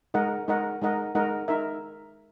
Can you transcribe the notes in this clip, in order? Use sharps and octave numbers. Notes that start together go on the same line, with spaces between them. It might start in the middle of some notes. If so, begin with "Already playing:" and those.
G#3 D#4 A#4 D#5 F#5
G#3 D#4 A#4 D#5 F#5
G#3 D#4 A#4 D#5 F#5
G#3 D#4 A#4 D#5 F#5
D#4 A#4 E5